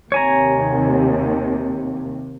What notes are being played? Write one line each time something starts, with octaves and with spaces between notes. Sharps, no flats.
D#2 C3 C#5 G#5 A#5